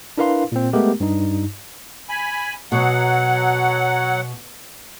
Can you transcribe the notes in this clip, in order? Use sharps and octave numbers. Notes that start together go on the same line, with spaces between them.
D4 E4 A#4 B4 F5 C6
A#2 C4
G#3 A3 B3 G4 A#4
G2 D#4
G#5 B5
B2 F#3 F#5